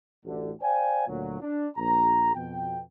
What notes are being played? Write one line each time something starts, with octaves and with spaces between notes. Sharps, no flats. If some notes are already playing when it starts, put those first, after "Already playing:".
A1 D2 A2 D3
C5 D5 F5 G5 G#5
D2 A#2 F#3
D4
A#1 A#5
F2 B2 G5